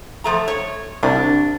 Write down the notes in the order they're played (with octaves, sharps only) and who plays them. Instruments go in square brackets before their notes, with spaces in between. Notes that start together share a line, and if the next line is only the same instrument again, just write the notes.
[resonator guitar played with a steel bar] F3 A3 A#5
C#5
[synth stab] C2 [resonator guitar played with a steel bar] D4